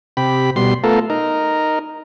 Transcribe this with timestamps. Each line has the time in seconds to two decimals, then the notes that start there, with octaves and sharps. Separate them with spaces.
0.17 C3 G4 B5
0.56 B2 G3 C6
0.84 A3 B3 F4 A4 A#4
1.10 D#4 A#4